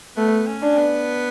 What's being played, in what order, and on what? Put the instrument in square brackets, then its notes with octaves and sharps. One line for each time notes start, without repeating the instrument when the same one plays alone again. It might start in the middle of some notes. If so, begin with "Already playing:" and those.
[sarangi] A3 [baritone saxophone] B3
[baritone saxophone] C#4
[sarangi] D4
[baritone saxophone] B3